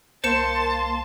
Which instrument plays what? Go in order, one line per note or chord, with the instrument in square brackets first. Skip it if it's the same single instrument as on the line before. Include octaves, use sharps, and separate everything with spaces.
[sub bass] C2 [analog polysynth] A#3 C6 [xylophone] C5 C#7 E7 [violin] A5